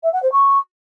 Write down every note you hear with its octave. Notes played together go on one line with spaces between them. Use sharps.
E5
F#5
C5
C#6